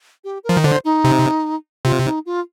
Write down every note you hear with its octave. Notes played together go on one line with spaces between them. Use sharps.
G4
A#4
F3
D#3
D3 C5
D#4
C3
C3 F4
D#4
F4